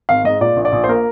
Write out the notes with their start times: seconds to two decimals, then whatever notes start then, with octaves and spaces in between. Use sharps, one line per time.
0.09 G#1 F5
0.24 G#2 D#5
0.41 A#2 D5
0.57 A#1
0.65 D5
0.72 A#1
0.84 C5
0.88 A#3 A#4